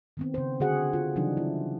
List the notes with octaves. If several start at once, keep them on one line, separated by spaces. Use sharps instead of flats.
D#3 B3 C4
C#3 C5
D3 F#4 G#4 F#5
F4
C#3 E3 F#3 G3 D4 D#4
E4